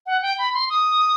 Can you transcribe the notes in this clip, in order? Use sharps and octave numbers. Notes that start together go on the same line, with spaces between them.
F#5
G5
B5
C6
D#6